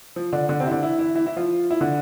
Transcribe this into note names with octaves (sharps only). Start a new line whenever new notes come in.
F3
D3 D4
D3 D4
C3 C4
E4
D3 D4
E3 E4
E3 E4
E3 E4
E3 E4
F3 F4
E4
D3 D4